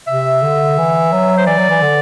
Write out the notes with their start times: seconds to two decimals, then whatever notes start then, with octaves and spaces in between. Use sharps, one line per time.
0.07 C3 E5
0.43 D3
0.78 E3
1.13 F#3
1.37 C5
1.47 E3 D5
1.58 F#3
1.69 E3
1.82 D3